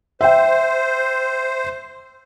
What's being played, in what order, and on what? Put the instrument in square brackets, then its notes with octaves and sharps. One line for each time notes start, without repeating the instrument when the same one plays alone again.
[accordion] C5 [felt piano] E5 G5